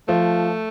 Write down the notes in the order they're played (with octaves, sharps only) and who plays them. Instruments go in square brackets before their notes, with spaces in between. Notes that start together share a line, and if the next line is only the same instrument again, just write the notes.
[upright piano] F3 [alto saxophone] A3